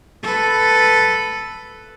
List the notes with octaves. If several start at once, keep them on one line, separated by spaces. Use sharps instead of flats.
A4 B4